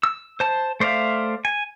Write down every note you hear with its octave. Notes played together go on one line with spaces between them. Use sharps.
E6
C5 A5
A3 C5 D5 E5 F5
G#5